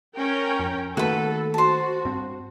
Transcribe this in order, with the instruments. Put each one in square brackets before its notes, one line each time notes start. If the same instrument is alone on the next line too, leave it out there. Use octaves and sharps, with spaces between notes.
[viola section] C#4 A#4 G5
[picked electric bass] F2
[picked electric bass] D#3 A3 A#3 [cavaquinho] F#4 B4 [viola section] A4
[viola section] F#4 [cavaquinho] C5 A5
[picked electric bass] G2 C4